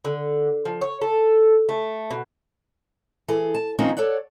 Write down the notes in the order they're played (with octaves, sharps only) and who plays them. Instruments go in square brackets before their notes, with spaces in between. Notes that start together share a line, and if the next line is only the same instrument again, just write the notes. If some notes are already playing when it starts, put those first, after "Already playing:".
[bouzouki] D3
F3
C#5
A4
A3
B2
[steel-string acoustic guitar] E3 G#4 A4
A5
D#3 F3 A#3 C4 C#4 D#4
A4 C#5 D5 F#5